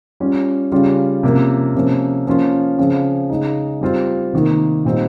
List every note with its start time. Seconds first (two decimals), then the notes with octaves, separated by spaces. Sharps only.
0.20 G3 C#4 F4
0.72 C#3 G3 C#4 F4
1.23 C3 F3 A#3 C#4 F4
1.75 C3 F3 A#3 C#4
2.27 F3 A#3 C#4 F4
2.79 C#3 F3 C4
3.30 C#3 G#3 D#4
3.81 G3 C4 F4
4.33 C3 D#3 A#3
4.85 A#2 G3 C4 D#4